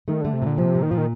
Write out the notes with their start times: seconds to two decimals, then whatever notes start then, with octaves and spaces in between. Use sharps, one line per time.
0.08 D#3 A3
0.21 D3 A3
0.33 C3
0.42 A#2 D3
0.58 C3 F3
0.75 A#2
0.83 D#3
0.91 A#2 F3
0.98 D#3